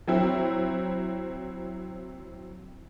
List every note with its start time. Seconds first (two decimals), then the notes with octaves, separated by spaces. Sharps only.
0.08 F#3 C4 E4